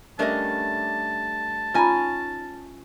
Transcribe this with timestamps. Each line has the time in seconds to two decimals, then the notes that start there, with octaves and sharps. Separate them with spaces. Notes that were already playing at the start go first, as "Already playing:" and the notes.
0.19 G3 A3 C#4 D4 A#4 D#5 A5
1.74 C#4 D#4 F4 D#5 G#5 A#5 B5